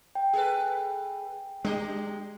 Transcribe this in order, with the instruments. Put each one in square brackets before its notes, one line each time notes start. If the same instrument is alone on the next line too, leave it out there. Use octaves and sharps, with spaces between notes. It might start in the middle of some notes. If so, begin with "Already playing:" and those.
[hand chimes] G5
[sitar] G#4 A4 B4
[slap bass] G#3 [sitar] D4 G4 D#5